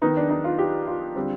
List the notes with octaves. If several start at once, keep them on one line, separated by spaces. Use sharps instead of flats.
D#3 B3 D#4
D4
D#4
F4
G4
F4
D3 G3 C4